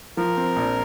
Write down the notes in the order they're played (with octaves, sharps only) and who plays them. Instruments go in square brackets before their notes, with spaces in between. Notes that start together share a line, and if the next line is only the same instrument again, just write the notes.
[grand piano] F3 [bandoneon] A#4
[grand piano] C4
A#1